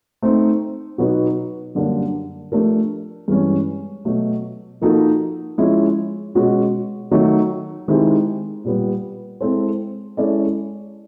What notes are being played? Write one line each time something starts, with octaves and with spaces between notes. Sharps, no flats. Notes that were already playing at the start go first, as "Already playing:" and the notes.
A3 C4 D#4
B2 F#3 B3 D#4 F#4
F#2 D3 G3 A#3 D4
F3 A3 D4 G4 A#4
G2 E3 G#3 C#4
B2 F#3 A3
F3 A#3 D#4 F#4 A4
F3 G#3 C#4 E4
B2 G#3 C#4 F#4
D#3 F#3 A3
D#3 G#3 C4 E4 G4
A#2 G3 B3
G#3 C4 E4 A4 C5
G#3 C#4 E4 A4 D5